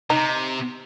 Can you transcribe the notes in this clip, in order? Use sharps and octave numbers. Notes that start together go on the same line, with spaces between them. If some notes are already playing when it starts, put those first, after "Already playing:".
C3 D#4